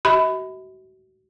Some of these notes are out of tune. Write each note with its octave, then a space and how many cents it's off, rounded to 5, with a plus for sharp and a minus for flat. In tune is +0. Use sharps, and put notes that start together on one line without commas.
F#4 +35 E5 -45 B5 +20